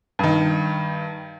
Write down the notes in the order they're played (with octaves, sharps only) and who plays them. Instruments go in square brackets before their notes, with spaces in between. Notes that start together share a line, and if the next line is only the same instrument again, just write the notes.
[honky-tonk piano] G2 D#3